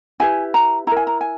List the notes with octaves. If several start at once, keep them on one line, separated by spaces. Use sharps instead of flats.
E4 G4 B4 G#5
A#5
E4 A#4 A#5
G#5
A#5
G#5